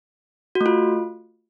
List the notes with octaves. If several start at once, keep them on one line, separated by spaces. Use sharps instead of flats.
F#4
A3
F4